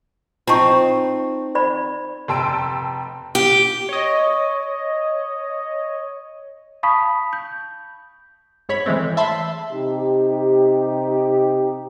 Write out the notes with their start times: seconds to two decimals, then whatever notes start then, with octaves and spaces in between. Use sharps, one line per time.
0.47 C4 D#4 F4 A5 C#6
1.55 C5 D5 B5
2.28 F1 G5 A5 C6 E6 D7
3.35 G4
3.89 C#5 D#5
6.83 F5 A5 B5 C#6 D#6 B6
7.33 G6
8.69 G#2 C#5 B5
8.86 E3 G#3 A3 C4
9.17 E5 A5 B5 C6
9.71 C3 D#4 G4